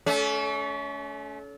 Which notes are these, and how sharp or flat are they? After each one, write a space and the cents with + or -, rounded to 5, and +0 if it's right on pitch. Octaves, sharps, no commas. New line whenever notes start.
A3 -30 C#4 +30